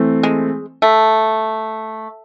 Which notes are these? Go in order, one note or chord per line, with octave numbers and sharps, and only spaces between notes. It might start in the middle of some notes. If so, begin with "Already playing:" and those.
Already playing: E3 A3 C4
G#3
A3